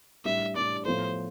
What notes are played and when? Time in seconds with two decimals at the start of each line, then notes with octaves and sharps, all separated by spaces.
0.25 A2 G3 D4 E5
0.56 A2 G3 D4 D5
0.86 A2 F3 B3 F4 A4 C5